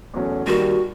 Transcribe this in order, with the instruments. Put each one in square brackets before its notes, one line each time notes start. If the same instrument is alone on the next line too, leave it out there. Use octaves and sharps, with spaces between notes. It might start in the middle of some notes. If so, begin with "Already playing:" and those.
[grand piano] E2 B2 F#3 A3 C#4
[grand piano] D#2 D#3 G3 [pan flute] F#4